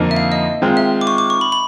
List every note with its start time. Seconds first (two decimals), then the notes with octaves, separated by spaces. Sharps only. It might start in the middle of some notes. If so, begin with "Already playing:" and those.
Already playing: F2 D3 F3 A#3 D#4
0.11 E5
0.16 F5
0.32 D#5
0.62 D#3 G#3 C4 F4
0.77 E5
1.01 D6
1.07 C#6
1.18 D6
1.30 C#6
1.41 B5
1.52 B5